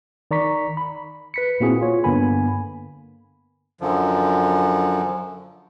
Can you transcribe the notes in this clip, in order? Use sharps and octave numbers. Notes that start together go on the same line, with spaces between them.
D#3 D5 A#5 C#6 B6
B5
B4 B6 C#7
A#2 A#3 C4 E4 F#4 G#4
F4 C#5
G2 D3 A#3 B3 G#5 B5
F#2 D3 F3